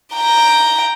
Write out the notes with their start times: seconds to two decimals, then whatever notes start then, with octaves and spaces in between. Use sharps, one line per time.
0.15 G5 A#5